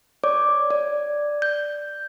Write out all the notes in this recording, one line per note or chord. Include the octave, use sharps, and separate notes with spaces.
C#5 D5 D6
D5
G6